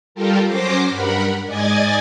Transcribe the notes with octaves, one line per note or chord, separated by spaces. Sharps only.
G3 F4 G4 A4 A#4
F#3 C#4 C5 D6 A#6 C7
G2 A#4 F#5 B5
G#2 D5 D#5 G#5 G#6 A6